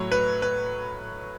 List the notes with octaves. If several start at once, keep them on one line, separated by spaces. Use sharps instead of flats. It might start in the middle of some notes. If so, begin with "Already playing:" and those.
Already playing: A2 F#3 C#5
B4
B4